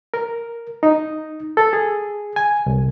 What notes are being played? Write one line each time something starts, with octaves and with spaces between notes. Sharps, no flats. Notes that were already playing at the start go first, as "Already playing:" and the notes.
A#4
D#4
A4
G#4
G#5
C2